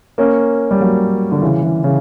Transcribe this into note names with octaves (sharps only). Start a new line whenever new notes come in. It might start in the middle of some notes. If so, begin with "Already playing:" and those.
A#3 C#4
G3
F#3 A#3
D3
C#3 E3
C#3 E3
C#3 E3